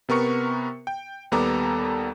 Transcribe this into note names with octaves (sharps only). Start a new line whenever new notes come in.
C3 B3 A#4 C#6 C#7
G5
D#2 G3 B3 A4 A#5 D6